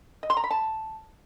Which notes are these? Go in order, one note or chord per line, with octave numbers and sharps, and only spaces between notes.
D#5
C6
A#5
B5
A5